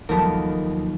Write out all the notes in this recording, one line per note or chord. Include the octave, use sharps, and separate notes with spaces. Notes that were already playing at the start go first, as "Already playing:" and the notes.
D#2 F3 F#3 B3 A4 A#4